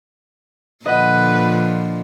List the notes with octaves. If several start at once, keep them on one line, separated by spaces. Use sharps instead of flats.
A#2 D3 F3 B4 D#5 F#5